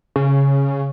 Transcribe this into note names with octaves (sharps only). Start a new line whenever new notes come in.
C#3